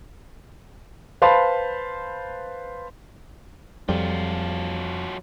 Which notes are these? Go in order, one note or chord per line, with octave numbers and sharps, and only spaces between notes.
B4 C5 F5 A5 B5 C6
F2 F#3 G3 F4